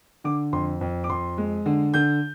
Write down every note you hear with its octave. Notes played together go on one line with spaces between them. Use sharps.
D3 D6
F2 C6
F2
D6
F2 C6
G#3
D3
D3 G6